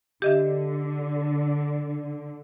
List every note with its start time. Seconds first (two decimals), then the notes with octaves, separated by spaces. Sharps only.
0.22 D3 G4 D#5 E5